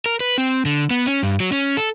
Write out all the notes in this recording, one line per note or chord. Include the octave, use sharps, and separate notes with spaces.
A#4
B4
C4
D3
B3
C#4
G2
F#3
C#4
A4